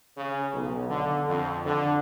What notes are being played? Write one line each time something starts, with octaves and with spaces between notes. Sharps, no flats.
C#3
B1
D3
F2
D3